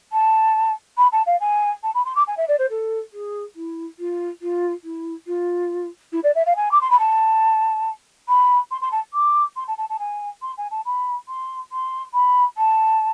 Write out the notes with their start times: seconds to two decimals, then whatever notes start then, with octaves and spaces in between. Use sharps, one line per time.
0.12 A5
0.97 B5
1.12 A5
1.26 F5
1.40 G#5
1.83 A5
1.94 B5
2.05 C6
2.15 D6
2.27 G#5
2.37 E5
2.48 D5
2.59 C5
2.70 A4
3.13 G#4
3.56 E4
3.99 F4
4.42 F4
4.84 E4
5.27 F4
6.13 E4
6.24 D5
6.35 E5
6.46 F5
6.56 G#5
6.71 D6
6.81 C6
6.90 B5
6.99 A5
8.28 B5
8.71 C6
8.81 C6
8.92 A5
9.13 D6
9.56 C6
9.68 A5
9.78 A5
9.90 A5
9.99 G#5
10.42 C6
10.58 G#5
10.71 A5
10.85 B5
11.28 C6
11.72 C6
12.14 B5
12.57 A5